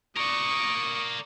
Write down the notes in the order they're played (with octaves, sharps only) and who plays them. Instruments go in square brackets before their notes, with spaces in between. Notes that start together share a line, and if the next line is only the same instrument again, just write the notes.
[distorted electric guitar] A#4 D5 [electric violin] C#6 D#6